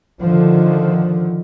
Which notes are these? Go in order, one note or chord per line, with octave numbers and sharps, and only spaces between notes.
D3 D#3 F3